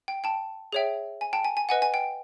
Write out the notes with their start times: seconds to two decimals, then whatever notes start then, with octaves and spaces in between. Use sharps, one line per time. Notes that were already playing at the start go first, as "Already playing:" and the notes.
0.08 G5
0.24 G5 A5
0.73 G#4 C#5 E5 G5
1.21 G#5
1.33 G5 A5
1.44 G#5
1.57 G#5
1.69 B4 D#5 F#5 G#5
1.82 G#5
1.94 G5